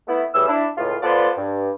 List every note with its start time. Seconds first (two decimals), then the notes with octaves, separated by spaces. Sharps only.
0.08 A3 B3 E4
0.34 A2 E3 G3 G#4 E6
0.48 D4 E4
0.78 C#2 A2 F4
1.02 B3 F4 A4 B4 C5 D5
1.38 G2